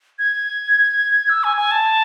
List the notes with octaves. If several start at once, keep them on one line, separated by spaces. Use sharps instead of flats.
G#6
E6
G#5
G#5
A5